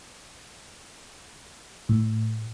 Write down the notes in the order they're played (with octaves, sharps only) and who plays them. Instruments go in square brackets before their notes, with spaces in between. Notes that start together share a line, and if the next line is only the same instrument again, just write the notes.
[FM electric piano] A2